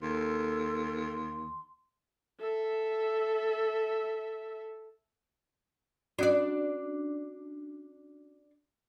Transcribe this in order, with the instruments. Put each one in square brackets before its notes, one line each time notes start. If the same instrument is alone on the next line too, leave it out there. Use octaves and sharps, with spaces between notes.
[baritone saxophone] D#2 [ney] A4 [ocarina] C6
[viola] A4 E5
[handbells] C#4 F#4 [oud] D4 D5